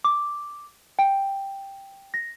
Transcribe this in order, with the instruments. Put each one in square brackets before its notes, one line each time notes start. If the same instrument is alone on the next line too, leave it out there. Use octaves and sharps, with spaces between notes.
[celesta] D6
G5
A#6